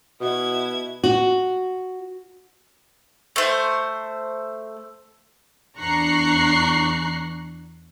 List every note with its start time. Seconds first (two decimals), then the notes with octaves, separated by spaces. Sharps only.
0.21 B2 E4 G#6
1.04 F#4
3.36 A3 C5
5.77 E2 D4 A#5 C#6 F#6 C7